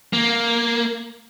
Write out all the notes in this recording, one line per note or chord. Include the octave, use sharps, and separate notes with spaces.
A#3